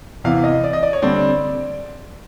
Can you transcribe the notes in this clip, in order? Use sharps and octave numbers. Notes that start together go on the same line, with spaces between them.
E2 C3 E3 F5
D#5
D5
D#5
D5
C#5
D3 G3 C4 D5